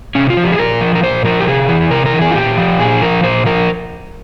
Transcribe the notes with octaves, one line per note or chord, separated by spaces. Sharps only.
C3 C#4
F4
F3
G4
G#4
A#2 A#4
F3
A#4
A#2 C5
F3 A#4
G4
C3 G#4
E3
C3 A#4
A#4
E3
G#4
F4
A#2 G4
F3
A#2 G#4
F3 A#4
A#2 C5
F3 A#4